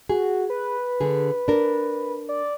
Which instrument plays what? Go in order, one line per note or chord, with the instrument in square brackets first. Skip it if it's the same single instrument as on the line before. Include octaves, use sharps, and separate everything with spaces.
[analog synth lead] F#4 [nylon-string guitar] G#4
[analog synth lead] B4
[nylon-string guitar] D3 G#4
D4 A#4
[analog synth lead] D5